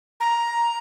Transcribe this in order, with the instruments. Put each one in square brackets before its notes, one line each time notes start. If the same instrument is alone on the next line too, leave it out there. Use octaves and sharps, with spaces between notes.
[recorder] A#5